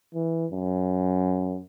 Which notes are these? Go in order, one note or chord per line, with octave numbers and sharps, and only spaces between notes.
E3
F#2